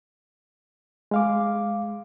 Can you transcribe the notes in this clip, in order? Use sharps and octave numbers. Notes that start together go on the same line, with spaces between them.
G#3 F5 D6